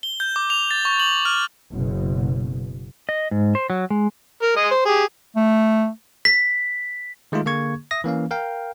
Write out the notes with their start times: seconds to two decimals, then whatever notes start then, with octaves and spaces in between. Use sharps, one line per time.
0.03 G7
0.20 G6
0.36 D6
0.50 F7
0.71 A6
0.85 C#6
1.00 F#7
1.25 F6
1.70 F#1 B2
3.09 D#5
3.31 G#2
3.55 C5
3.70 F#3
3.90 G#3
4.42 A#4
4.56 G#3 D#5
4.71 C5
4.85 G4 G#4
5.36 A3
6.25 B6
7.32 D#3 G#3 A3 D#4 F4
7.46 D3 A#3 G#4 C#6 G#6
7.91 E5 D#6 A#6
8.04 E3 A#3 C#4 F5
8.31 A#4 F5 G5